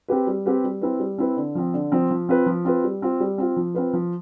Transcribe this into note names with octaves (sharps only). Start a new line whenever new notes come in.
C4 G4 B4
G3
C4 G4 B4
G3
C4 E4 B4
G3
C4 E4 B4
D3
F3 C4
D3
F3 C4
F3
C4 F4 B4
F3
C4 F4 B4
G3
C4 F4
G3
C4 F4
F3
C4 F4 B4
F3